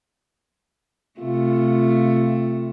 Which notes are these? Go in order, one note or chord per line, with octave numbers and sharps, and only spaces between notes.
C3 A3 F4